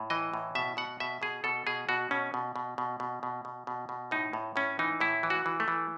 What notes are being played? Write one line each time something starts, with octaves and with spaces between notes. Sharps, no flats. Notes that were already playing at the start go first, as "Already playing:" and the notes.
Already playing: A2
E3 D#5
A2
B2 E5
B2 F#5
B2 E5
B2 G#4
B2 A4
B2 G#4
B2 F#4
B2 C#4
B2
B2
B2
B2
B2
B2
B2
B2
A2 D#4
A2
A2 C#4
E3 D#4
A2 E4
E3
F#4
E3
A3
E3